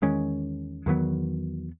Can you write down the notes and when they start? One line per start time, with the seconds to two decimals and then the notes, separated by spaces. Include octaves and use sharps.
0.02 E2 D#3 G#3 C#4
0.86 E2 D#3 F#3 B3